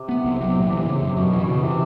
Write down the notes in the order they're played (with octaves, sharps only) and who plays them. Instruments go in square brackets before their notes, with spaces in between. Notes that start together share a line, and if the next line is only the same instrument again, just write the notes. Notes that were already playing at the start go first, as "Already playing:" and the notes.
Already playing: [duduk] C3
[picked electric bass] B3
C2
F#3
A#2
E3
C#3
F#2
[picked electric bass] F#2 [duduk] B2
[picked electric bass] E3
[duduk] B2
[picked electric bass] C#3
[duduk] C3 [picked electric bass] E3